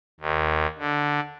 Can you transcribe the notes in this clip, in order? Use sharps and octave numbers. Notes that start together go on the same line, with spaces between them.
D#2
D3